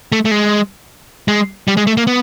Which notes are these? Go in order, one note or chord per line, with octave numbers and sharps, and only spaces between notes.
A3
A3
G#3
G#3
G3
G#3
A3
A#3
B3